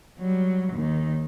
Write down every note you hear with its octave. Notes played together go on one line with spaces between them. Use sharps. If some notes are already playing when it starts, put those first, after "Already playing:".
F#3 G3
D#2 D#3